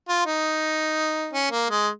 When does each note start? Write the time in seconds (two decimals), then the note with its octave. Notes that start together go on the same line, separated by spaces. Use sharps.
0.09 F4
0.26 D#4
1.33 C#4
1.51 A#3
1.70 G#3